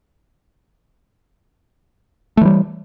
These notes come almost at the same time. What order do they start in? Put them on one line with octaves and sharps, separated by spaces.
A3 E3 G3